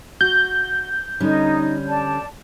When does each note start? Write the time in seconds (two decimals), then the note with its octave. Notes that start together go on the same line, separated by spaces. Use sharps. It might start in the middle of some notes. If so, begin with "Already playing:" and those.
0.21 F#4 G6
1.20 D3 G3 C#4 D#4
1.88 D5 A5